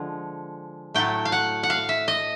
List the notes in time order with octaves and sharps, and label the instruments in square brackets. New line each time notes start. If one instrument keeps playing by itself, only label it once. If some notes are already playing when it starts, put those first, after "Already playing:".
Already playing: [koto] D3 F3 G#3
A2 F#3 A3 G5
F5
F#5
F#5
F5
E5
D#5